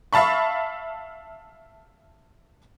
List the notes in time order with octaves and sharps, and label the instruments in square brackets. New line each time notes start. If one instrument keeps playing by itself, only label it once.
[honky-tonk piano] E5 F5 A5 B5 C#6